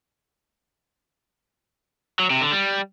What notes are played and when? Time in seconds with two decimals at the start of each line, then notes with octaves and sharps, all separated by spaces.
2.19 F#3
2.30 C3
2.41 D3
2.52 G3